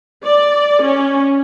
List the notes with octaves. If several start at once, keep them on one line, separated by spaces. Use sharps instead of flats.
D5
C#4